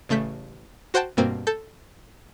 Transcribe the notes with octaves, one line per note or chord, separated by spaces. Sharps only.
A1 C#3 A3 G6 B6
F#4 C5 F#5 G5 A5
G2 B2 A#3 C4
A4 G6